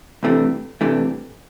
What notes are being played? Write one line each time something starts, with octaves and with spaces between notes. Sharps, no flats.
C2 C3 E3 A3 D4
C2 C3 E3 A3 D4